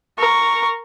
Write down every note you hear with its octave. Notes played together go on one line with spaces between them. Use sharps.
A#4 C#6